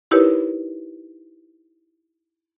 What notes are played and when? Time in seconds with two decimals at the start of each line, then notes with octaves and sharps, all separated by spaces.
0.11 D#4 E4 G4 A#4 B4 C#5